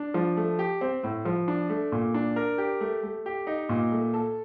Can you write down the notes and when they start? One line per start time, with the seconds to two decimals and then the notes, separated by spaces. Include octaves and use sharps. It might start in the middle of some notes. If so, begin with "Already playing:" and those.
Already playing: D4
0.14 F3
0.37 A3
0.59 G4
0.81 C4
1.04 A2
1.25 F3
1.48 D4
1.70 A3
1.92 A#2
2.14 D4
2.36 A#4
2.58 G4
2.81 A3
3.03 A3
3.26 G4
3.47 D#4
3.69 A#2
3.92 A3
4.14 A4